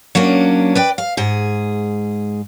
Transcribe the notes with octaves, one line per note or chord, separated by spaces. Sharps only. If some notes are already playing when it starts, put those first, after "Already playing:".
F#3 A#3 C#4 D4
B4 D5 G5
F5
G#2 G#4